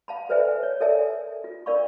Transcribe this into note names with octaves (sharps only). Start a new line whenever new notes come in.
F5 A5 B5
A4 B4 C5 D5 E5 G#5
C#5
A4 A#4 D5 E5 G#5 A5
F4
D4 A#4 D5 F5 B5 C#6